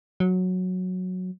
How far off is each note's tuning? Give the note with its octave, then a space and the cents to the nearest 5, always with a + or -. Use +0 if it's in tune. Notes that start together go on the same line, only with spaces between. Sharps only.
F#3 -10